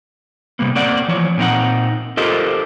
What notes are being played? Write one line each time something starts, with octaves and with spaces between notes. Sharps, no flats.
C3 G3 A#3 B3
A#3 C4 D5 F#5
E3 F3 C#5
A#2 C4 D#4 F#5
F4 G4 A4 A#4 C5 D#5